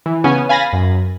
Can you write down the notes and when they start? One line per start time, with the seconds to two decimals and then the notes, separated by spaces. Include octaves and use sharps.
0.06 E3
0.24 C#3 B3 C#4 G#5
0.49 F5 G#5 B5 A6 A#6
0.73 F#2